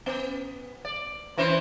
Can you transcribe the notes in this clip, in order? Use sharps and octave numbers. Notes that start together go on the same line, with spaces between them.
B3
D5
E3 C#4 C5